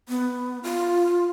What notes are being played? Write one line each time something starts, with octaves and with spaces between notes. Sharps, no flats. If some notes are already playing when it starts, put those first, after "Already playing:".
B3
F4